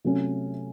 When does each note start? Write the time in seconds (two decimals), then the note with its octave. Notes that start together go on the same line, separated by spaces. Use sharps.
0.04 C3 F#3 A3 C#4 A4